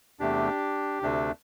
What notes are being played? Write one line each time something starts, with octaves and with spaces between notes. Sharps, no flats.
E2 C3 A3 D4 G4
D2 C3 A3 D4